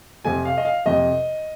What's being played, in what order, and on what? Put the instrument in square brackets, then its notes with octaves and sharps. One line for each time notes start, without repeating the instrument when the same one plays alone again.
[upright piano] F2 C3 F3 G#5
F5
D#5
F5
F2 C3 F3 D#5